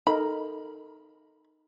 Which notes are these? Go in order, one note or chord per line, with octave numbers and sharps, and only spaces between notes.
D#4 A4 A#4 B5